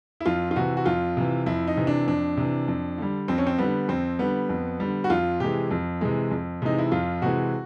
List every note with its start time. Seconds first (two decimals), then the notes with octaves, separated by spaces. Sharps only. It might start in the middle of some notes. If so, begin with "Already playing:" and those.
0.21 E4
0.26 F2 F4
0.51 F4
0.56 C3 E3 F#4
0.77 F#4
0.86 F2 F4
1.17 C3 E3
1.46 F2 E4
1.67 D#4
1.77 C3 E3
1.87 D4
2.07 F2 D4
2.37 C3 E3
2.68 F2
2.98 D3 G3
3.28 F2 C4
3.38 C#4
3.47 C4
3.58 D3 G3 B3
3.88 F2 C4
4.19 D3 G3 B3
4.49 F2
4.80 D3 G3
5.04 F#4
5.10 F2 F4
5.40 C3 E3 G#3 G4
5.71 F2
6.01 C3 E3 G#3
6.31 F2
6.62 C3 E3 G#3 D#4
6.79 E4
6.92 F2 F4
7.22 C3 E3 G#3 F#4